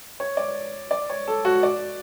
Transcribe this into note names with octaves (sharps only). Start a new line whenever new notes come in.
C#5
D5
D5
C#5
A4
F#4
D5